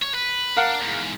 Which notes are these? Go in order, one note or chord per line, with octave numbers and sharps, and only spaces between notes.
C#5
B4
D4 A#4 F5 F#5
E2 G#2